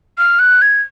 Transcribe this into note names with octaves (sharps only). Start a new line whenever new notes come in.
F6
F#6
G#6